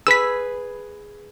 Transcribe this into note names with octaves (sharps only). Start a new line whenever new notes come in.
G#4 B4 E6 B6